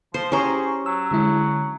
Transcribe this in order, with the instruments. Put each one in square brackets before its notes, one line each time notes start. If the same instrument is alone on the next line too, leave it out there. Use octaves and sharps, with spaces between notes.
[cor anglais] F3 [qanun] C5
[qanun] C#4 G4 C5 [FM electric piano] E4 A#5 C#6 [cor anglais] G#4
[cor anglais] F#3 [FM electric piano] E6
[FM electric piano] D3 G#3 E4